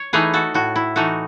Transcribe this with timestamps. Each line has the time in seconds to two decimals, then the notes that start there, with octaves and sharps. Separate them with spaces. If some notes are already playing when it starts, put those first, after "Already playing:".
Already playing: C#5
0.13 E3 A3 D#4 G#4 B4
0.33 F#4 A4
0.54 A2 F#4
0.76 E4
0.96 E3 A3 D#4 F#4